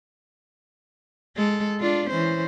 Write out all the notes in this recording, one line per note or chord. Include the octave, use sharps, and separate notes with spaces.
G#3 A4
D4 F4
E3 C#4 C5